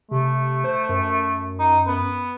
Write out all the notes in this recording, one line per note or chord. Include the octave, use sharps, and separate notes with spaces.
C3 A3
C5
F#2
D#4
B3